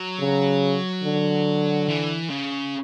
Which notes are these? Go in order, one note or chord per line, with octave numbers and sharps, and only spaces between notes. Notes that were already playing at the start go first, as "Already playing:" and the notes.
Already playing: F#3
C#3
D3
E3
C#3